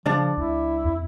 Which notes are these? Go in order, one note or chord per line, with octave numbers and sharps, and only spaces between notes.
C#3 F3 D4 D5
C#2 E4
F2